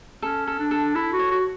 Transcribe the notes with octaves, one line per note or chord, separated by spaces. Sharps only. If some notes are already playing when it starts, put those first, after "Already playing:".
C#4 A4
A4
D4
A4
E4 A4
F#4
C#5
F#4